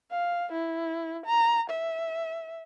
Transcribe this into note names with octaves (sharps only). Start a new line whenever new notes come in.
F5
E4
A#5
E5